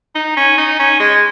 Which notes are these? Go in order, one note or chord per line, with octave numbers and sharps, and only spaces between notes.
D#4
C#4
D#4
C#4
G#3